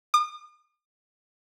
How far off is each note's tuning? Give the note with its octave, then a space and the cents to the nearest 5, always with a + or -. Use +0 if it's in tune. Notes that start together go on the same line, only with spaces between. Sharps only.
D#6 -45